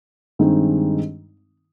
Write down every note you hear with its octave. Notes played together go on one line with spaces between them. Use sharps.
G2 D#3 G#3 C4 D#4